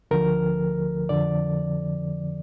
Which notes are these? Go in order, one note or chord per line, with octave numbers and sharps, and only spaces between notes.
D2 D3 F3 A#4
F2 D3 F3 D5